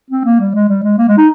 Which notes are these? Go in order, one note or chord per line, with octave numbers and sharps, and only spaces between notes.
C4
A#3
G3
G#3
G3
G#3
A#3
G#3
D#4